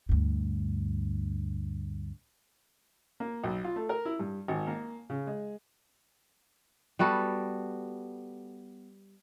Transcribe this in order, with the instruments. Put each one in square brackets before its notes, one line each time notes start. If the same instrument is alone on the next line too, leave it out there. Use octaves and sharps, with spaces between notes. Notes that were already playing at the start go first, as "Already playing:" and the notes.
[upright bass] D2 G2
[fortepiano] A#3
B1
F4
A3
A#4
E4
G2
G#1
A#3
C#3
G#3
[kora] G3 B3 F#4 A4